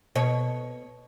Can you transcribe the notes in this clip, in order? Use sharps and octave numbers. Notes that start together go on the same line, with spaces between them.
B2 C#5